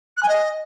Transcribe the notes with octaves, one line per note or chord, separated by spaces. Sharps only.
F#6
G#5
D#5